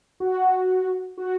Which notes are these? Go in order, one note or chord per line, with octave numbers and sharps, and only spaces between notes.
F#4
F#4